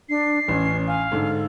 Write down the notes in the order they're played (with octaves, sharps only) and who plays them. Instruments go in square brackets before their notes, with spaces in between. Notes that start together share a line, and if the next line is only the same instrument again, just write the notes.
[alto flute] D4 [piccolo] C7
[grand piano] A1 [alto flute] C#4
[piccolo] F5 [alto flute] G#5
[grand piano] G#2 D3 [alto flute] A4